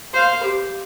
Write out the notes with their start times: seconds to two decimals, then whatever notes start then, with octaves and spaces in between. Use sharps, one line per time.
0.13 C5 F5
0.44 G4